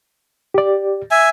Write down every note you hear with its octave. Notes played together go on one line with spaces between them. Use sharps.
G4 D5
E5 G#5